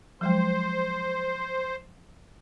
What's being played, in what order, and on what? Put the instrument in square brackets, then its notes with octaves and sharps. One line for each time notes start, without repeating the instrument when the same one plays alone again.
[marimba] F3 F#3 G#3 [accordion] C5